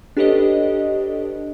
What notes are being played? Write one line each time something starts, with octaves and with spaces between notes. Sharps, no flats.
D4 G4 A4 B4 C#5 D#5